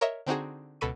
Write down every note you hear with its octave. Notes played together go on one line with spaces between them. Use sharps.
A#4 C#5 D#5 E5
D3 C4 D#4 F#4 G#4
C#2 B2 A4 B5 C#6 D#7